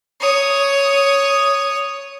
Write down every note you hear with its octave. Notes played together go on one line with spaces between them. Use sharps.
C#5 D#6